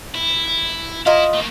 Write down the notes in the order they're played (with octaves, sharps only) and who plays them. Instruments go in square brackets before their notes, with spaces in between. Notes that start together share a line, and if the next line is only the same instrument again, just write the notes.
[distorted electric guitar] E4
[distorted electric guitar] E4 [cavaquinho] F4 D#5 A#5
[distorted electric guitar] A3 A#3